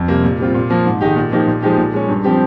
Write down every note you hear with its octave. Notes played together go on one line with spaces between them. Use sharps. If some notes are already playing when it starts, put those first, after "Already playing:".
Already playing: F2
C3 G3 A#3
A#2
G3 C4 F4
A#2
F3 A#3
G#2
D#3 G#3 D#4 G4
A#2
F3 A#3 D#4 G4
A#2
F3 G#3 D#4 G4
A#2
G#3 C#4
G2
F3 C4 G4